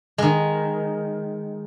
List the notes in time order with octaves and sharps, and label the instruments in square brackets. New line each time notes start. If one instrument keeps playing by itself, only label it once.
[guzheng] D#3 G#3